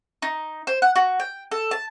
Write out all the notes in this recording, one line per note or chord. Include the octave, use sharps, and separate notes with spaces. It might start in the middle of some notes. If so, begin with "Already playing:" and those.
D#4
C5
F#5
F#4
G5
A4
A5